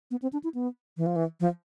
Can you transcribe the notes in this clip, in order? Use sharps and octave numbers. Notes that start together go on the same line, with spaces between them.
B3
C4
D4
E4
B3
E3
F3
E3
F3